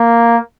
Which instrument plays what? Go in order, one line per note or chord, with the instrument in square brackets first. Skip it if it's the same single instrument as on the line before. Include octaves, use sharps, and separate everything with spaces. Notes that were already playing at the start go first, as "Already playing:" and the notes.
Already playing: [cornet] A#3